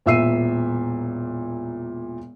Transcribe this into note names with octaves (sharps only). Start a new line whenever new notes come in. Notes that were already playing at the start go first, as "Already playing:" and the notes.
E1 A#2 E5 E6 C7 D#7